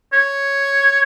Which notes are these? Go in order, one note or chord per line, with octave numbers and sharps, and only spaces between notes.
C#5